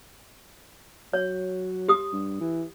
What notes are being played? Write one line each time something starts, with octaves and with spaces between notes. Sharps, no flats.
F#3 C#5
G4 D#6
G2
E3